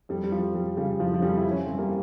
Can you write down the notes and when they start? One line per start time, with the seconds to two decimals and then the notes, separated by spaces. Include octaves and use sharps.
0.09 F2 G3
0.24 G3
0.32 F2 F3
0.54 F2 G3
0.77 C#3 G3
0.99 F2 F3
1.14 F3
1.22 F2 G3
1.37 E4
1.45 E3
1.51 C#4
1.65 G2 C4
1.78 G3 A#3